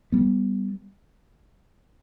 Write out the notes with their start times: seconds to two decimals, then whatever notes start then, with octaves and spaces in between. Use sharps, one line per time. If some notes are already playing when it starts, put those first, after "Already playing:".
0.12 G3 B3